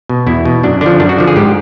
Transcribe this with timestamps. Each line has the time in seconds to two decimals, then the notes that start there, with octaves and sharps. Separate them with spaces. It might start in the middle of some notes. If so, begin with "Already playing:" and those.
0.09 B2
0.27 E2 E4
0.45 B2
0.63 F#2 D4
0.81 D3 F3 D4
1.00 F#2 D4
1.09 F#4
1.18 D3 F3
1.27 G#4
1.36 G#2 G4